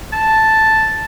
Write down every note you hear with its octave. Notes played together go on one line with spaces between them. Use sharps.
A5